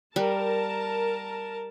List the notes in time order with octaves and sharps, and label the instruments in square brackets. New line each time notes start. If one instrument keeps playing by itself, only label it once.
[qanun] G3 [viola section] A#4 A5